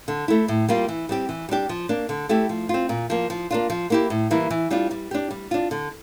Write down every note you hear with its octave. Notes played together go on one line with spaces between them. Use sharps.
D3
A3 E4
A2
G3 A#3 F4
E3
G3 C4 G4
E3
G3 D4 G4
F3
A#3 D4
D3
A3 E4 G4
F3
C4 F4
A#2
F3 A#3
F3
A#3 D4 F4
F3
A#3 E4 G4
A2
E3 G3 A#3 E4
E3
G3 D4 F4
G3
D4 G4
G3
D4 F4
D3